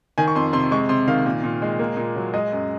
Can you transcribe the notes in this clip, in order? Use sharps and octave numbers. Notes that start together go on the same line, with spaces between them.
D#3 G#5
C#6
F2 C6
C3 C6
G#3 C#6
C3 C6
D#3 F5
A#2
A#2
G#3
A#3
A#2
F#3
G#3 D#5
F#2